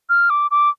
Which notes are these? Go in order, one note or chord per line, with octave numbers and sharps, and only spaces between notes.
F6
D6
D6